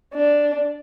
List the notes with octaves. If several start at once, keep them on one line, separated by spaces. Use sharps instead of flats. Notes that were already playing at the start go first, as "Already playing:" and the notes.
D4